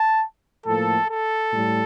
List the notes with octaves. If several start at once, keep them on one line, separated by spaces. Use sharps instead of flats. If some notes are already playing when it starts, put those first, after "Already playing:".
Already playing: A5
A2 F3 A#3 A4
A4
A2 G3